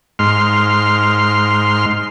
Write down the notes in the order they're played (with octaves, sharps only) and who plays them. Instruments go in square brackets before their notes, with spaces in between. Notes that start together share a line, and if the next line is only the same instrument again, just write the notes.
[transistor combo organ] G#2 C6 F6